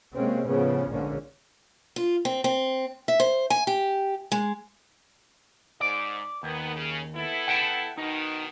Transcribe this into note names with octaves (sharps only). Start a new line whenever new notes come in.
C3 G#3 A#3 C4 C#4
A2 C#3 F3 B3 C#4
A#1 G#2 D3 A#3 C#4
F4
C4
C4
E5
C5
G#5
G4
G#3
G#2 D5
D#2 D#3 B3
C#3
B3 E4 A4
F#5 G5 A5
B2 D#3 D#4